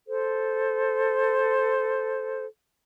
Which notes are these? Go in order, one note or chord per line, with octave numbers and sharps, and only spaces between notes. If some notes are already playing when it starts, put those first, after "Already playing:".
A4 C5